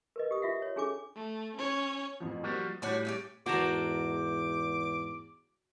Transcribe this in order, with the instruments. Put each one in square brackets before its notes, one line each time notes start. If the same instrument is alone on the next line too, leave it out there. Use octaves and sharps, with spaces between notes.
[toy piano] A#4 B4 D#5
G4 D#6
F4 E5 F#5
C#5
C#4 D4 G#4 A4 G#5 D6
[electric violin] A3
C#4 C#5
[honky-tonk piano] A1 F2 F3
[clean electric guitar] F3 G3 F#4 [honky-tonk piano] A#3 C4 F4
[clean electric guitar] A2 G3 [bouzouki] D4 F#4 C#5 [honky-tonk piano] D6
[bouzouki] C#4 D#4 G4
[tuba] E2 [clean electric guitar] G#2 C5 A5 [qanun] F#4 A#4 [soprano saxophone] D6